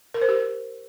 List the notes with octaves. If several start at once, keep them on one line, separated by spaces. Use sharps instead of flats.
A#4
C5
G4